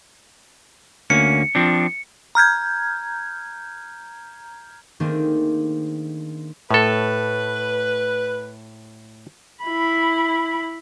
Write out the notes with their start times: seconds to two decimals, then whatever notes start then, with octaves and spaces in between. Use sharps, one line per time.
1.10 D2 A#3 C#4 C#7
1.55 F3 C4 D4
2.35 A#5 F6 G6 G#6
5.00 D#3 A3 A#3 C4 D4 G#4
6.71 A2 A4 B4
9.64 E4 B5